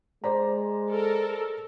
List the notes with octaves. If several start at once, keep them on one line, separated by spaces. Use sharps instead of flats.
G#3 C5 D5 A#5
A4 A#4